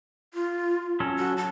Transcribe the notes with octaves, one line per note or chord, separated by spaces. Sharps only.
F4
F#3 C#4 A4
F#4
A5